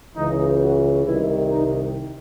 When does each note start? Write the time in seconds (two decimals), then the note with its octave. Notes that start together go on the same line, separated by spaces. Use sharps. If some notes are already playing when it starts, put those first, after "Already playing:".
0.16 C#2 C#3 E3 D#4
0.61 F#4
1.05 C2 C3 D#3 E4
1.49 D#4